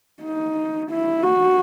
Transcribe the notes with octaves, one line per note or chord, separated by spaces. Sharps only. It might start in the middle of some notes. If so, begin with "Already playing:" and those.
D#4
E4
F#4